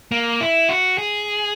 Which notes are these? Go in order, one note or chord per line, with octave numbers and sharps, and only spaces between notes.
A#3
E4
F#4
G#4